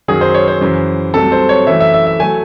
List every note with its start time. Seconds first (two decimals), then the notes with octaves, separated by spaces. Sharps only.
0.08 F#2 D#3 F#3 G#4
0.21 C5
0.34 C#5
0.48 C5
0.61 F#2 C#3 E3
1.14 C2 C3 F#3 A3 A4
1.32 C5
1.49 C#5
1.67 F#2 E3 A3 E5
1.80 E5
1.94 E5
2.07 E5
2.20 F#3 A3 G#5